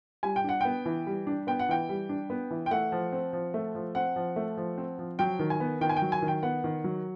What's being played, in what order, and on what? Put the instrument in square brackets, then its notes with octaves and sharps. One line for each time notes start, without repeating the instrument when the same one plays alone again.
[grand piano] G3 G#5
G5
D4 F#5
B3 G5
E3
G3
D4
B3 G5
F#5
E3 G5
G3
D4
B3
E3
G5
A3 F#5
F3
C4
F3
A3
F3
C4 F#5
F3
A3
F3
C4
F3
F#3 G5
D#3
G#5
B3
D#3 G5
G#5
G5
F#3
G#5
D#3
G5
B3 F#5
D#3
F#3